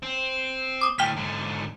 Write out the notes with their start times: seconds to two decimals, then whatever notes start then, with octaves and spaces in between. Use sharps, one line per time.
0.03 C4
0.81 D6 D#6
0.99 A2 D3 G5 F6 B6
1.16 G#2 D3